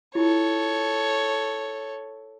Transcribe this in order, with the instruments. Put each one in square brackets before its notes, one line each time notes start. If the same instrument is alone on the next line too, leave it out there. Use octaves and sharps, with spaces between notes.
[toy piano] E4 F4 G4 [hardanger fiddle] A4 C#5